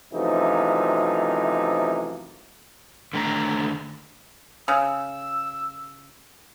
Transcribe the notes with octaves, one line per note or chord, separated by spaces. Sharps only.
F#2 C3 E3 F3 A3 D#4
D3 D#3 A3 A#5
C#3 E6